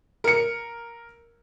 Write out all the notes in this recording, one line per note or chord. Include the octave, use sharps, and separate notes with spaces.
A#4 C#7